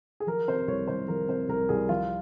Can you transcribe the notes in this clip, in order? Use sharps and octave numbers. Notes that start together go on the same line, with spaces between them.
G#4
F3 A#4
C3 C5
C2 C#5
C2 C5
F3 A#4
C3 C5
C2 A#4
C2 G#4
F3 F4